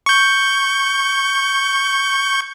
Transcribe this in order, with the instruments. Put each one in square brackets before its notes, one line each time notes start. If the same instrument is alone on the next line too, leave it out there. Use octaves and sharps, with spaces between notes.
[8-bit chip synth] C#6 G6